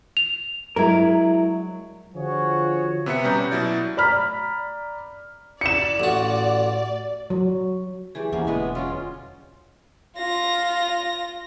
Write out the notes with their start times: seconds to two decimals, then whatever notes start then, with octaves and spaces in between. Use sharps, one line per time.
0.17 F7
0.76 F#3 G#3 D4 E4 A#4
2.14 D3 F3 F4 F#4 G#4 C#5
3.06 C3 B3 E5 C#7
3.24 B2 G3 C#4 B4 A#5 G6
3.51 B2 F#3 E4 D5
3.97 D5 A#5 B5 F6 B6
5.61 D5 C#7 E7
6.00 A1 F#4
7.30 F#3
8.15 E3 A3 G4 G#4 D5
8.32 E2 C3 A#3 C#4 E4 F#5
8.47 E1 D3 G#3 B3 B4 G#5
8.75 F#3 G#3 C#4 F4 D5
10.17 F4 A#6